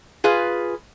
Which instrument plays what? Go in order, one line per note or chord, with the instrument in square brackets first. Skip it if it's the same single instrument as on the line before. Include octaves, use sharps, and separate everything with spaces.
[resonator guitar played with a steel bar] F4 G#4 B4 F5